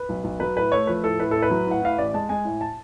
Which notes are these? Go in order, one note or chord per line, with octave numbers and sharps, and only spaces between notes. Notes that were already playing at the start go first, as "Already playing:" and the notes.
Already playing: B4
B1
B1
F#3 B4
A2 B4
A3 C#5
F3 B4
A2 A4
A2 B4
A2 A4
B4
F#3
A2 F#5
A2 F5
A1 D5
G#3 A5
G#3 G#5
A2
A5